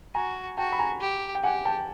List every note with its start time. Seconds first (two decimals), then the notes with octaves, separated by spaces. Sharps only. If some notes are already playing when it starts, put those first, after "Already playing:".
0.15 F#4 G#5 A#5
0.58 F#4 G5 A5
0.72 B5
0.79 G#5 A#5
1.01 G4
1.35 G5
1.43 G4 F#5 G#5
1.65 G5 A5